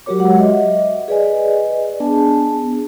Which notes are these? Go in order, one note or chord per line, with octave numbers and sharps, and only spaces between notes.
F#3 F#4 G4 A#4 C#5 D6
G#3 F#5
D#5 E5
G#4 B4 D5 D#5 G#5
B3 D4 G#4 G#5 A5